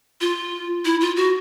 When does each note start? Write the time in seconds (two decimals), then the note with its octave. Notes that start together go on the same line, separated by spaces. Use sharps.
0.21 F4
0.85 E4
1.01 F4
1.16 F#4